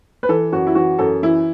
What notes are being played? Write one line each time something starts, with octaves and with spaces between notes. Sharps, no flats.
B4
E3 A4
F#2 F#4
E4
E3 F#4
F#2 A4
E3 E4